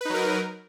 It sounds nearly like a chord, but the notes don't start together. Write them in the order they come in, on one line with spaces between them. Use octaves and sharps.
B4 D#4 F#3 A#4